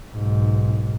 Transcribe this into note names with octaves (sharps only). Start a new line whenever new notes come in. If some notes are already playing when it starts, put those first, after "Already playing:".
B1 G#2